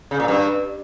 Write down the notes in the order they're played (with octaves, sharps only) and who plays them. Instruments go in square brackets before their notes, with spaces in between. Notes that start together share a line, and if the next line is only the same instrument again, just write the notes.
[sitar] C#3
A#2
G2